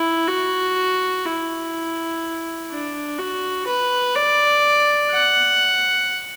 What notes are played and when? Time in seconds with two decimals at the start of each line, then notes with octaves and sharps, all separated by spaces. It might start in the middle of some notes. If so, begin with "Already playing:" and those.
Already playing: E4
0.28 F#4
1.25 E4
2.71 D4
3.18 F#4
3.66 B4
4.15 D5
5.11 F#5